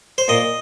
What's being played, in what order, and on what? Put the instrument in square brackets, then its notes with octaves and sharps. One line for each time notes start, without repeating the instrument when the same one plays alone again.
[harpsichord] C5
A#2 D#5